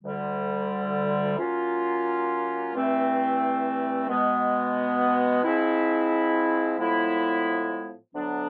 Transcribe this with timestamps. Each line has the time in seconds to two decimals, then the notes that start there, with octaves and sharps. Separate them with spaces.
0.04 D2 D3 G3
1.39 F#3 A#3 C#4 F4
2.74 G2 E3 A3 C4 E4
4.09 B2 G#3 B3
5.44 F3 G#3 C4 E4
6.79 A2 F3 G#3 B3 E4
8.14 D2 D3 F#3 B3 D4